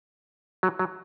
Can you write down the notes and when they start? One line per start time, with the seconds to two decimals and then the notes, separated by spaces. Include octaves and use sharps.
0.63 F#3
0.79 F#3